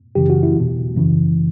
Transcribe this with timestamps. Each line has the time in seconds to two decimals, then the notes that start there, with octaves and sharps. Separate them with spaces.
0.15 F#2 C#3 E3 G4
0.30 F#4
0.43 E4
0.57 E2 B2
0.96 F#2 C#3 E3